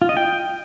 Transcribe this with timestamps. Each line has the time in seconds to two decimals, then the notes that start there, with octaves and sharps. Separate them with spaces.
0.02 F4
0.09 D#5
0.17 G5